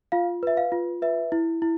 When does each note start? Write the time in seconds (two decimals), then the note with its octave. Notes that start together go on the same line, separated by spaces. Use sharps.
0.12 F4 F5
0.43 B4 E5
0.57 F5
0.72 F4
1.02 B4 E5
1.32 E4
1.62 E4